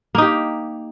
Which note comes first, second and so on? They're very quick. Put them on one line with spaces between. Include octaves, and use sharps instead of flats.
A#3 D#4 G4